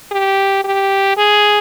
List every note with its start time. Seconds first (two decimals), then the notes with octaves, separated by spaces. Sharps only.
0.11 G4
0.64 G4
1.17 G#4